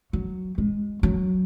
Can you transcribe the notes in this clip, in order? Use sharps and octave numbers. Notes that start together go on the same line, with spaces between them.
F#3
G#3
F#3